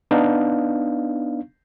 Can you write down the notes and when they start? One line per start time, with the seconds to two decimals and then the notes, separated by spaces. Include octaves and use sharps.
0.11 B3 D4 D#4 F5